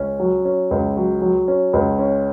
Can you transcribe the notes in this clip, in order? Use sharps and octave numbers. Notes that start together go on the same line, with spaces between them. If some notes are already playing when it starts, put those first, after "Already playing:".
Already playing: C#2 C#4
F#3
C#4
C#2
F#3
F#3
C#4
C#2
C#4